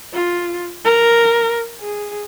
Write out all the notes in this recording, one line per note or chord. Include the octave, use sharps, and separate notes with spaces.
F4
A#4
G#4